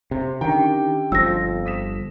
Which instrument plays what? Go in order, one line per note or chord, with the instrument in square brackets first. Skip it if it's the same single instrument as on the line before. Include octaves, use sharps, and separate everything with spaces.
[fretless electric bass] C3
[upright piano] D3 C#4 G5 [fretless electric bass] D#3 [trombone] G4
[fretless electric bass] G1 F3 [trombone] F2 [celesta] E6 A#6
[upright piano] D#6 B6 E7